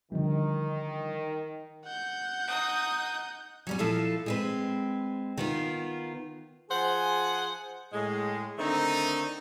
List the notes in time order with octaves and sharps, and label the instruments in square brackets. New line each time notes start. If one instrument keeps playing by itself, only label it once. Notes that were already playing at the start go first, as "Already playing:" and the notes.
[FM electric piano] D3 F3 G3 [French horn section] D#3
[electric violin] F#5 G6
[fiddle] D#4 D#6
[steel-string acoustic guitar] F#3 G3 C#4
A#2 F3 E4 A4 F5
G#3 C4 B4
D#3 B3 F4
[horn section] F3 G#4 C5 F#5 G#5
A2 G#3
D3 D#3 A3 C4 D#4